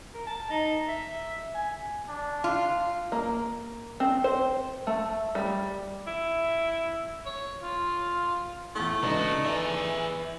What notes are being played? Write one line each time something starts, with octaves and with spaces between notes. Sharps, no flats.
A#4
A5
D#4
E5
G#5
D4
F4
A#3
C4
C5
A3
G3
E4
C#5
F4
E2 A2 A3
G#2 C#3 D4 D#4 F#4 B4
E3 G#4 D5 E5